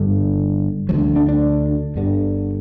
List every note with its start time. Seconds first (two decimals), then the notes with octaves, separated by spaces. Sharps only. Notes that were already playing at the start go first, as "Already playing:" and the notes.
Already playing: G1 G2 D3
0.89 D2 D3 F#3
1.16 D4
1.29 D4
1.96 G1 G2 D3